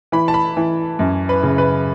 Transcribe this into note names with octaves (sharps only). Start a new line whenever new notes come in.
E3 B5
A5
B5
E3
F#2
B4
C#3
B4